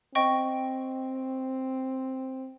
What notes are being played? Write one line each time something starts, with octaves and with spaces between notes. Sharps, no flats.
C4 D#5 G5 C#6